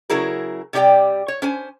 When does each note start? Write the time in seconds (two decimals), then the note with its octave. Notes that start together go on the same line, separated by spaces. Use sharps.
0.10 C#3 F#3 E4 G#4 A#4
0.73 C3 G3 G4 D5 G5
1.28 C#5
1.42 C#4 C5 G#5